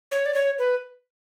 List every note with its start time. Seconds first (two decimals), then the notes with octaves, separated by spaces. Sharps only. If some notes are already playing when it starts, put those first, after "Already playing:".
0.11 C#5
0.26 D5
0.34 C#5
0.59 B4